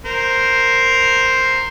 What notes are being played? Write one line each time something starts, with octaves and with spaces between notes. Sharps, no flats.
A#4 C5